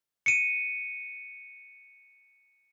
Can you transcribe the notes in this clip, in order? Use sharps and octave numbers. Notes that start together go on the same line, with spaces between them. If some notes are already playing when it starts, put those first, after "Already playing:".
C#7 D#7